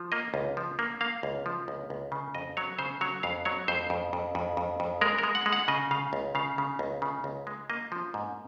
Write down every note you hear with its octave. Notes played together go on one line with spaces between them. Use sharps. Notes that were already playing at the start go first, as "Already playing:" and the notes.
Already playing: F3
A#3 D#5
C#2
F3
A#3
A#3 F5
C#2
F3
C#2
C#2
C#3
F2 D#5
F#3 C#5
C#3 C5
F#3 C#5
F2 F5
F#3 C#5
F2 C5
F2
F2
F2
F2
F2
G#3 A#4
A#4
G#3
F#5
G#3
F#5
C#3 D#5
C#3 F5
C#2
C#3 F5
C#3
C#2
C#3
C#2
G#3
A#3 D#5
F3
G#2